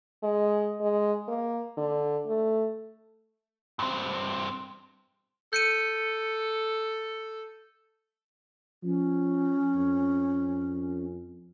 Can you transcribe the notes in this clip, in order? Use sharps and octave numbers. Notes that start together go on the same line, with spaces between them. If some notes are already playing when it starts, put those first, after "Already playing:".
G#3
G#3
A#3
D3
A3
G2 C4
A4 G6 C#7 D#7
F3 C#4
F2